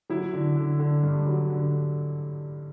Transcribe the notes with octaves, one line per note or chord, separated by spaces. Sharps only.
F#3 E4
D3
D3
D3
G2
F#3
D3